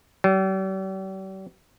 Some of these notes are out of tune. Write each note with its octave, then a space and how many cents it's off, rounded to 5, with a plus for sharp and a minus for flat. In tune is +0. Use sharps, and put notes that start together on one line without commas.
G3 -45